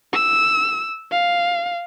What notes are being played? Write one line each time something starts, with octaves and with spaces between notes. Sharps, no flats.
E6
F5